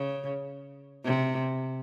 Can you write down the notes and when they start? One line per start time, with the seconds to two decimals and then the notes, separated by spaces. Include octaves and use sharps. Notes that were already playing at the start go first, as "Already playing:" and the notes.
Already playing: C#3
1.05 C3